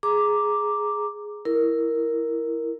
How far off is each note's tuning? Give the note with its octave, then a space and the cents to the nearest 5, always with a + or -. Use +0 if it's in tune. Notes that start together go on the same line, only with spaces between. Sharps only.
G#4 +10 A#5 +0 D6 +0
E4 +0 A#4 +0